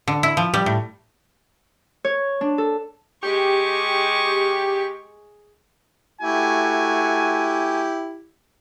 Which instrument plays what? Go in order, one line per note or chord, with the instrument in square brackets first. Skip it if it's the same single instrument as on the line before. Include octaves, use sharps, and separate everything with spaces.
[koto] D3
E4
F3
G3
A2
[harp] C#5
D4
A4
[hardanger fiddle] G#3 C#6 [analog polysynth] G4
[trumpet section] A3 F#4 G#5 [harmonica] E4 G4